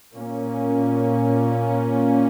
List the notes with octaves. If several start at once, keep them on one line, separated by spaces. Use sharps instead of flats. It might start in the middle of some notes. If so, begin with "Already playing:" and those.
A#2 A#3 C#4